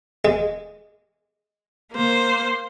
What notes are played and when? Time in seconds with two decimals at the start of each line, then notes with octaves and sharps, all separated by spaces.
0.25 G#3
1.93 A#3 C5